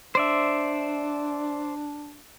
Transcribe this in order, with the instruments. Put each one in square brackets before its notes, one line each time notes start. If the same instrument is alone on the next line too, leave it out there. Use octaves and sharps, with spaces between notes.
[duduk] D4 [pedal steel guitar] C5 D5 E5